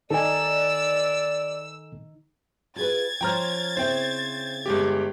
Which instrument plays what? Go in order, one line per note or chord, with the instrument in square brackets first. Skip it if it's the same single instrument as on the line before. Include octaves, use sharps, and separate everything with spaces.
[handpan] D#3 D#4 [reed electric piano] A4 G#5 [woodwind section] D5 [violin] E6
[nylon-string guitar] F4 G#4 B4 [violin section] G#6 A6
[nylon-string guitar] F3 C#4 C5 [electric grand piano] G5 A#5 F6
[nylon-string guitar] C#3 C4 E4 [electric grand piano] C5 G5
[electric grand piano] G1 G#3 G4